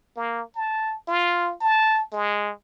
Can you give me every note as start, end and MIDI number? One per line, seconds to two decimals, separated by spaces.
0.16 0.43 58
0.55 0.96 81
1.08 1.54 65
1.61 2.04 81
2.12 2.52 56